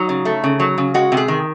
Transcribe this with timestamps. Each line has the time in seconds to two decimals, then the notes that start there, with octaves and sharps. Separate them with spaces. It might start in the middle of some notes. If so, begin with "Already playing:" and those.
Already playing: F#3 D#4
0.09 C#3
0.25 A3
0.44 C#3
0.60 F#3
0.78 C#3
0.94 G#3 F#4
1.12 C3
1.17 G#4
1.28 D#3